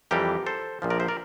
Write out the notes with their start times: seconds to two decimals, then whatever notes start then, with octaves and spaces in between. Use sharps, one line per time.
0.11 F2 E3 G3 G4 A#4
0.46 A4 C5
0.82 A#1 A#2 F3
0.90 A#4 D5
1.00 C5 E5
1.08 A#4 D5